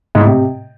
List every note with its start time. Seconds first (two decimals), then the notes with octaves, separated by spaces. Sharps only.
0.15 G#2
0.20 A2
0.25 C3